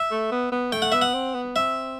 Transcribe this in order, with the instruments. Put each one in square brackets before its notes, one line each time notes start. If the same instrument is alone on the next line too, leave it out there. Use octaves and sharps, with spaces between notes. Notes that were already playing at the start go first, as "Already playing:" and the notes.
Already playing: [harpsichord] E5
[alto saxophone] A3
B3
B3
[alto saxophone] A3 [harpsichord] G5
[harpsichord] F#5
[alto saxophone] B3 [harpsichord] E5
[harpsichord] F#5
[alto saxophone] C4
B3
[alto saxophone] C4 [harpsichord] E5